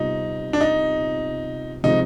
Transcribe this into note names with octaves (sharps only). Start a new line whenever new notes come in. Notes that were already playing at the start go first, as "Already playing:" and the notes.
Already playing: C3 G3 B3 D#4 F4
D4
D#4
C3 F3 G#3 C4 D#4 F4